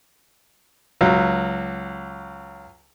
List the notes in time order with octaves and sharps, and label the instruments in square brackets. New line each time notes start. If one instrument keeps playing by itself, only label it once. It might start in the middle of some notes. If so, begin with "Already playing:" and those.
[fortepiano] C#2 F#3